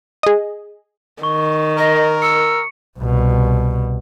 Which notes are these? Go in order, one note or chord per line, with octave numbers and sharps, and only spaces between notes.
G#4 D#5
D#3 C#6
A#4 D#5
E6 C#7
C2 B2